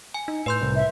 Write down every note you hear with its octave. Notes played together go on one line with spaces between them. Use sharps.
G#5
D#4
A2 B4 C6 G6
C2
E5